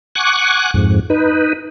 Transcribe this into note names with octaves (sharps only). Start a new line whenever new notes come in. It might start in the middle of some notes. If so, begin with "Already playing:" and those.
F#5 G#5 C#6 D6 F#6
F2 G#2
D#4 B4